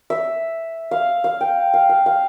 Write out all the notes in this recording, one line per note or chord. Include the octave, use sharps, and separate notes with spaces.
E5
F5
F5
G5
F5
F5
F5